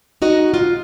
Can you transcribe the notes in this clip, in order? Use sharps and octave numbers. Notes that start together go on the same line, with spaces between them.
D#4 F#4 D#5
F4